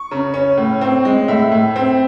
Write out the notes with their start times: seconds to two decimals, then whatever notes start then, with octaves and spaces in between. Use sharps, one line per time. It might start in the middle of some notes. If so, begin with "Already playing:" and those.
Already playing: C#6
0.11 C#3
0.34 C#4
0.58 A2
0.81 C4
1.05 G#3
1.28 A2 E5
1.52 A2
1.76 C4